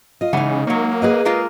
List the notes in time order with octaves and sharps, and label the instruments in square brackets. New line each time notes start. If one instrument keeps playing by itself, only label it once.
[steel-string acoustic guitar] F4 D#5
[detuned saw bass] C#3 [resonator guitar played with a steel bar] E3 F#5 G#5 [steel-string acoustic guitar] G#3 D#4
[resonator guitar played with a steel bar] F#3 C#5 [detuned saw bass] A#3
[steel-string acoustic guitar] G#4 B4 D#5
[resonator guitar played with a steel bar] G#3 A#3 F4